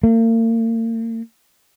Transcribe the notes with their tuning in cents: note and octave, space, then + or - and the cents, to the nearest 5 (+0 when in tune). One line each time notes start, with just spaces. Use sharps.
A#3 -40